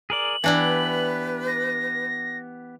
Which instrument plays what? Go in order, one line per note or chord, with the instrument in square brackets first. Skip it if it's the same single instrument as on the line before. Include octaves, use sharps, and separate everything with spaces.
[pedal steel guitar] G#4 A#4 D5 [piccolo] F#7
[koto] E3 D4 E4 [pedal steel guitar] B3 G4 [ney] B4
[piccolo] A#6